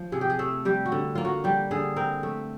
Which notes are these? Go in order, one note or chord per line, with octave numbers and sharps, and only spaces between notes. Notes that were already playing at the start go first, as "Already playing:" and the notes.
Already playing: F3
C3 G#4
G4
G#4
A3 A4
G3 G4
F#4
D3
A#3 F4
F#4
G3 G4
D3 G#4
C4 A#4
A3